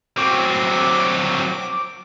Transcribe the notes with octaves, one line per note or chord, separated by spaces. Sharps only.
F#3 C4 D6